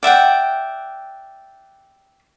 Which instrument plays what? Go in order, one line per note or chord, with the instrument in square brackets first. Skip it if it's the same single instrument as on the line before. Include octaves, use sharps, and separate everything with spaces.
[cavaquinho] D5 E5 F#5 G5